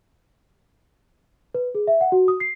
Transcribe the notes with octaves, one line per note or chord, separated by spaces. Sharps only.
B4
G#4
E5
F#5
F#4
D#6
C7